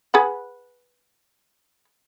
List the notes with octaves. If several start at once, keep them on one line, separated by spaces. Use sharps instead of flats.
G#4 B4 F#5